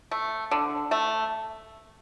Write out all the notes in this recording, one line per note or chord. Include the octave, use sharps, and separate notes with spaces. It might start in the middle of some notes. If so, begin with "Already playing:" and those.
A3
D3
A3